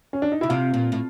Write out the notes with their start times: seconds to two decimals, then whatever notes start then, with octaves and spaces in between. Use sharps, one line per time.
0.13 C#4
0.22 D4
0.32 D#4
0.41 C#3 E4
0.49 C3 F4
0.74 A#2
0.92 A2